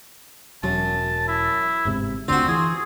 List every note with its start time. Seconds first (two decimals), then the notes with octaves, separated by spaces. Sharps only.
0.63 E1 F#2 F#3 A5
1.28 E4
1.85 G1 G#2 C3
2.28 F#1 D2 D3 C4 F4 F#4
2.48 E3 G#4